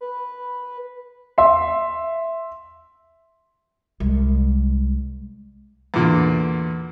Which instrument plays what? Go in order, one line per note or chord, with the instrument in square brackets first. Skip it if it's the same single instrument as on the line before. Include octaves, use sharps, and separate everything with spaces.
[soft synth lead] B4
[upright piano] E5 C6
[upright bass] C2 G#3
[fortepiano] E2 A#2 D3